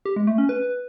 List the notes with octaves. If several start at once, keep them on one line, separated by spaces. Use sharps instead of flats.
G4
G#3
A3
C#4
B4